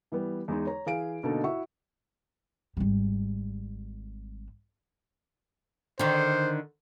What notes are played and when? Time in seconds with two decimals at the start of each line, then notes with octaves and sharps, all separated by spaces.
0.12 E3 G3 B3
0.48 E2 G#3 D#4
0.67 C#5 A#5
0.86 E3 G#4 F5 G#5 D7
1.23 B2 D3 A#3 D#4 A4
1.44 E4 F#4 E5 F#5 C#6
2.77 G#1 G3
5.99 D3 D#3 C5